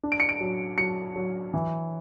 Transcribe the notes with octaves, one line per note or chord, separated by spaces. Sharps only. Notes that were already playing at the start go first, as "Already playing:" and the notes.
D4
D7
C#7
D7
F#3
F#3 C#7
F#3
E3